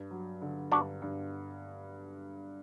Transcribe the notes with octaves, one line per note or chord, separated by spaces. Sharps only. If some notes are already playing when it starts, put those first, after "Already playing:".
Already playing: G2
F#3
D3
G2 D4 F#4
G2